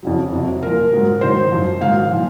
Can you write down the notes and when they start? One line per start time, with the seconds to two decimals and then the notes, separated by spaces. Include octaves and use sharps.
0.03 F2 C#3 F#3
0.33 F2 C3 F#3
0.62 A#2 F3 A#4
0.92 G#2 F#3
1.21 G#2 D#3 F#3 C5
1.52 F#2 F3
1.81 G#2 D#3 F#3 F5
2.11 A#2 F3